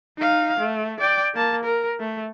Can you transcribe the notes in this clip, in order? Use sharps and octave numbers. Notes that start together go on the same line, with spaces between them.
D#4 F5
A3
D5 G5
A#3 A5
A#4
A3